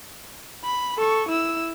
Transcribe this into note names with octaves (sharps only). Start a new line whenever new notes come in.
B5
A4 C#6
E4 E6